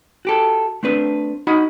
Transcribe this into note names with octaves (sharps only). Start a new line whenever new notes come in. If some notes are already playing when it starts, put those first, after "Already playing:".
F#4 G4 A4
A3 C4 D4 B4
D#4 F#4 F#5 B5